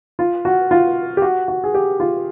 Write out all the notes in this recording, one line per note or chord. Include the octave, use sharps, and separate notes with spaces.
F4
F#4
F4
G4
F#4
F#4
G#4
G4
F4